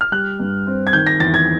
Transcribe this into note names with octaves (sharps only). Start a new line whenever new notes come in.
F6
G3 F#6
G2
C4
G#6
D#3 G6
A#6
E2 A6
G#6